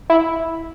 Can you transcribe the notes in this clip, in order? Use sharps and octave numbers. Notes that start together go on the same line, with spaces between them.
E4